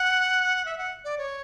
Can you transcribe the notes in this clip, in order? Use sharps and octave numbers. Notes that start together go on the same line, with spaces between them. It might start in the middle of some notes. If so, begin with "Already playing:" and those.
Already playing: F#5
E5
F#5
D5
C#5